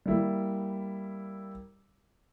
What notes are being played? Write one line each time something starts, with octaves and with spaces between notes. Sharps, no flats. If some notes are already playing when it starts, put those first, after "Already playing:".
G3 A#3 E4